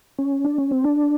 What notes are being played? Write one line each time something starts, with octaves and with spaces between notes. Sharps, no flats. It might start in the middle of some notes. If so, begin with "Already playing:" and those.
C#4
D4
C#4
C4
D4